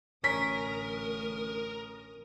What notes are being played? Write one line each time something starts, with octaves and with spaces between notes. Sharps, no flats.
A1 D2 C#4 A#4 D#6 B6